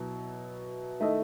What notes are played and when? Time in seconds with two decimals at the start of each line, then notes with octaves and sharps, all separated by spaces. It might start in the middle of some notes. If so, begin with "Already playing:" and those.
Already playing: B2 F#3 E4
1.00 D#3 A3 E4 A4 D#5